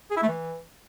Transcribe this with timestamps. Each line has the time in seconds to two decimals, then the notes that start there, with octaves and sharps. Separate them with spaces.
0.11 G#4
0.16 E4
0.22 A3
0.28 E3